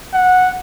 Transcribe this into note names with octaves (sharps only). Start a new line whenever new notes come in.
F#5